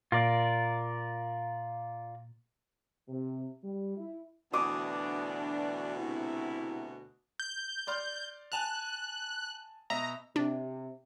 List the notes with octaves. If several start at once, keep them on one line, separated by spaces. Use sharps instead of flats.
A#2 F4 A#4 D5
C3
G3
E4
D2 B2 E3 D4 F#4 D6 D#6
C3 E4
G6
D5 C6 F6
G#5 A5 F#6 F7
B2 D#5 E5 A#5
C3 D4